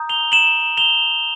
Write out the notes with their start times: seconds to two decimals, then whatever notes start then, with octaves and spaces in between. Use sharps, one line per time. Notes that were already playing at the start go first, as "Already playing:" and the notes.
Already playing: A#5 D#6 G6
0.09 F7 G7
0.32 E7 F#7
0.77 F7 G7